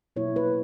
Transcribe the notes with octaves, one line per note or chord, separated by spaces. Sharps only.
B2 F#3 A#3 E4 C#5
B4